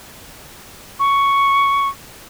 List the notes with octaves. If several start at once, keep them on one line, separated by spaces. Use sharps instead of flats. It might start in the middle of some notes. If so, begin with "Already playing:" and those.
C#6